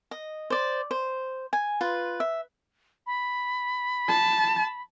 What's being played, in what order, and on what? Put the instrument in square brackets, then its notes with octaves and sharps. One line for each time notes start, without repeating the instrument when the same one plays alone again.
[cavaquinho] D#5
C5 D5
C5
G#5
F4 B4 C6
E5
[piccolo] B5
[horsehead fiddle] A5